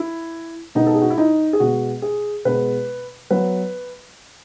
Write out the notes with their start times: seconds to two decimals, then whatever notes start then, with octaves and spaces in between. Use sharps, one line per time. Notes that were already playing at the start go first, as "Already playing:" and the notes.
Already playing: E4
0.75 B2 G#3 B3 D#4
0.87 A4
0.95 G#4
1.02 F#4
1.10 E4
1.18 D#4
1.53 G#4
1.60 B2 G#3 B3 F#4
2.02 G#4
2.45 B2 G#3 B3 B4
3.31 F#3 B3 B4